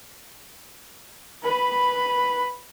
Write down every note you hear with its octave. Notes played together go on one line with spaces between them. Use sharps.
B4 B5